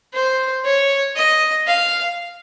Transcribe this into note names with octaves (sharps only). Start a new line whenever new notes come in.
C5
C#5
D#5
F5